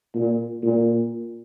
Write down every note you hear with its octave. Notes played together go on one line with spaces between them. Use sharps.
A#2
A#2